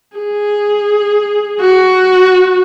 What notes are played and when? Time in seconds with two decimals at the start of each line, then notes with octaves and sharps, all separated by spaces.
0.17 G#4
1.60 F#4